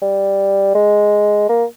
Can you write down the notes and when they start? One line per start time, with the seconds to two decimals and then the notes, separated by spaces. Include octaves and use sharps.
0.02 G3
0.75 G#3
1.49 A#3